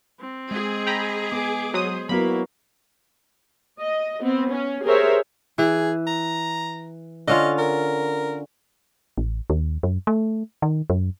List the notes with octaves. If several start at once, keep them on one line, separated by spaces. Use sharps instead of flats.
C4
G#3 G#4
G5 A#5 B5
B3 G#5 D6
F#3 C5 D#6
F#3 A#3 B3 E4 F#4 B5
D#5
B3 C4
C#4
G4 G#4 A#4 C5 C#5 E5
E3 G#4
A#5
D3 C#4 F4 D#5
A#4
A1
D#2
F#2
A3
D#3
F#2